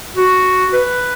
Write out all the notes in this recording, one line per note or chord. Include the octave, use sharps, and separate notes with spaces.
F#4
B4